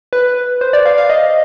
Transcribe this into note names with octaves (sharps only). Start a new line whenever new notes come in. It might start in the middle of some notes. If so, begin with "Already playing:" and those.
B4
C5
D5
F5
F5
D#5